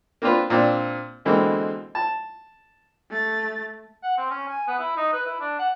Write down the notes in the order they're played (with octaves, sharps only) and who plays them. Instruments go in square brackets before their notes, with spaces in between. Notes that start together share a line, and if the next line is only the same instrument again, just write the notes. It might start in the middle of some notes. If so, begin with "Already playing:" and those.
[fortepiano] A#3 C4 D4 F4 B4
A#2 C4 D4
B2 D3 E3 G#3 A#3 C4
A5
[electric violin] A3 A6
[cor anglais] F#5
C4
C#4
G#5
B3
E4
D#4
B4
E4
D4
F#5